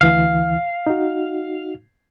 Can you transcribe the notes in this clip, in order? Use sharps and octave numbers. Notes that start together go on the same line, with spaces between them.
D2 E3 F5
D#4 F#4